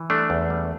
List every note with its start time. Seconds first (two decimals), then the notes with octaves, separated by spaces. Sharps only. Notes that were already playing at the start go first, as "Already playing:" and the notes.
Already playing: E3
0.10 G3 A3 D4
0.30 E2
0.50 G3